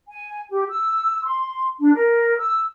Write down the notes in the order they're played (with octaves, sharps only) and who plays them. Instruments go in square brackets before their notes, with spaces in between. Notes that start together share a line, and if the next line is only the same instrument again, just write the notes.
[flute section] G#5
G4
E6
C6
D4
A#4
E6